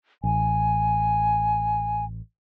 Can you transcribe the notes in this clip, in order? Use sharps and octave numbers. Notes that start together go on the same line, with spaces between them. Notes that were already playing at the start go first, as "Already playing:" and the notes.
A1 G#5